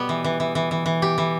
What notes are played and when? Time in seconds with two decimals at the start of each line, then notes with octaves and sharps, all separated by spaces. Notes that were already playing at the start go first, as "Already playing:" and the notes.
Already playing: B2 G3 B3 G4
0.09 E3
0.24 E3
0.40 E3
0.55 E3
0.71 E3
0.86 E3
1.02 G4
1.18 E3